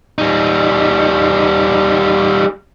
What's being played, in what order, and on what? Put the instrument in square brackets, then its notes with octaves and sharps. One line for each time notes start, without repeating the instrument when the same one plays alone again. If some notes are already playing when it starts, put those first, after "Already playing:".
[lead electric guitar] G3 D#4